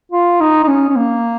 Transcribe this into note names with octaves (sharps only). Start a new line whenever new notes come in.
F4
D#4
D#4
C#4
C#4
A#3